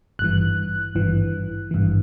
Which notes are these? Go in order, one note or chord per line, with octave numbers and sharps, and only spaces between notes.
G#1 G2 E3 F#6
G#1 G2 E3
G#1 G2 E3